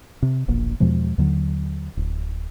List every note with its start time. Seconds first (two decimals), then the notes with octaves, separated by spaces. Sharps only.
0.23 C3
0.48 E1 A#1 A#2
0.80 E2 B2 F3 G#3
1.18 D#2 D3 F#3
1.97 D1